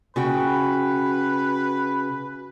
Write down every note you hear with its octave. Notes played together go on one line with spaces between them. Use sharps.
C#3 F#4 B4 G5